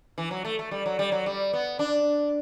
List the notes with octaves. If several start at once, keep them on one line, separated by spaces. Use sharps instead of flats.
E3
F#3
A3
A3
G3
F#3
G3
F#3
G3
B3
D4